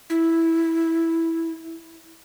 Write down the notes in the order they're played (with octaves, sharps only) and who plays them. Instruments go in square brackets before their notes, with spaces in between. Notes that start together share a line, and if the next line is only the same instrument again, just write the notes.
[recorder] E4